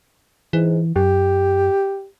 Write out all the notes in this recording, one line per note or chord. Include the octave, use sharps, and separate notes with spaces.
G#2 E3
F#2 G4